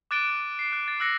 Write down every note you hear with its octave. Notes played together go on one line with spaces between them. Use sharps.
D6 F#6 A6 D7 D#7 G7
A6
C7
F#6
A6
E6 F#6 A#6 C#7